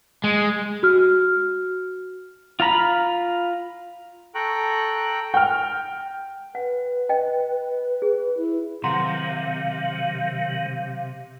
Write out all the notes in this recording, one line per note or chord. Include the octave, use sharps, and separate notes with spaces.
G#3
F#4 F6
F4 F5 A#5 B5
A4 G5 A#5 C#6 F#6
G5 F6
B4 F#5
D#5 G5
G#4
E4
C3 D#3 F#3 F5 F#5 A#5 C6